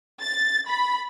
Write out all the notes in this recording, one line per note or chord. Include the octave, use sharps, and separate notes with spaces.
A6
B5